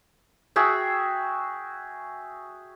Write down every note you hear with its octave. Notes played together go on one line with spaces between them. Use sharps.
F#4 G#4 E5 G5